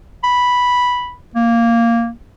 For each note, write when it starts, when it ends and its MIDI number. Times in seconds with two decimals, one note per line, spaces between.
0.24 1.14 83
1.36 2.10 58